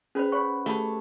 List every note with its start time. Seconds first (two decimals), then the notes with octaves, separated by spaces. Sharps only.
0.15 C#4 G#4 B4 C5
0.32 C#5 F#5 B5 C#6
0.66 A3 G4 G#4 F5 B5